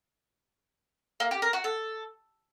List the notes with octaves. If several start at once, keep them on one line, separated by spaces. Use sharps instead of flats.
A#3
G4
A#4
F#4
A4